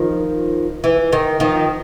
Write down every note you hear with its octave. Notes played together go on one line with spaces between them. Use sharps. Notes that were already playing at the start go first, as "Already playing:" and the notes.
Already playing: D#3 F3
E3
D#3
D#3 F3